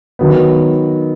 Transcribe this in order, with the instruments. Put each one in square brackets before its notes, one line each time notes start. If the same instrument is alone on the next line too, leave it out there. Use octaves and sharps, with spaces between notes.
[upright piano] D#3 F#3 B3